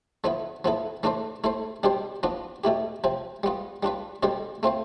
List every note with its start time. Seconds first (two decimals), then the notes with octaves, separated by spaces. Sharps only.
0.24 D3 F3 B3 E4
0.64 F3 B3 E4 A4
1.03 E3 A3 D4 A4 C5
1.44 A3 E4 A4 C5
1.83 B2 G3 D4 G4 C5
2.23 F3 B3 D4 F4
2.64 B2 A3 E4 G4
3.04 C3 F3 C4
3.43 G3 B3 F4
3.83 G3 D4 F4 B4
4.23 B2 G3 D4 A4 C5
4.63 A3 C4 F4 C5